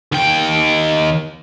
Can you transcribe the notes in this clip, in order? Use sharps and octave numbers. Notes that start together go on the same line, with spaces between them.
D#2 G5